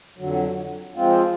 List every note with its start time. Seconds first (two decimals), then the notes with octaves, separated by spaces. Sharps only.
0.18 F2 D3 F#3
0.95 F3 G#3 C4 F4